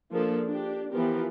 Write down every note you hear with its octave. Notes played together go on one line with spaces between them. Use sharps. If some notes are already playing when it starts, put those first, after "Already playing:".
F3 A#3 D4 G#4 A4
D4 G4
E3 F3 B3 G4 A#4